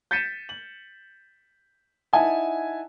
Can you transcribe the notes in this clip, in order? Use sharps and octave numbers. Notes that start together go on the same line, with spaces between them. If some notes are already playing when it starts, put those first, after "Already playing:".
G6 A6 B6 C#7 D#7 E7
F#7
D#4 E4 E5 F#5 G#5 A5